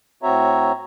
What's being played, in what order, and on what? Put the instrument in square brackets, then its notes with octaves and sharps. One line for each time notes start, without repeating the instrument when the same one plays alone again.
[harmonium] A2 C4 F#4 C#5 E5 A#5